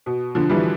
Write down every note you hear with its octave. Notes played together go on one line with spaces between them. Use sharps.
B2
D3 F3
E3 G3